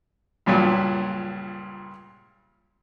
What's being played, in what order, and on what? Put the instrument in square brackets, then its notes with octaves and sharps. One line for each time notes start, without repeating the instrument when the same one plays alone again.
[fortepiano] C#2 G2 A#2 F#3